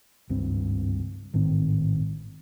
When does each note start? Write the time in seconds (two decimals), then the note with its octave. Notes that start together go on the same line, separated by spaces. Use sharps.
0.29 G#1 C#2 G2 C4
1.34 A1 G#2 D#3 C4